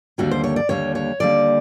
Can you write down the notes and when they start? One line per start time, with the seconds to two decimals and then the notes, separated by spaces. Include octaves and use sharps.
0.18 D#2 D3 G3 A#3 F#4
0.31 C5
0.44 C#5
0.56 D5
0.69 D#2 D3 G3 A#3 C#5
0.95 C#5
1.20 D#2 D3 G3 A#3 D5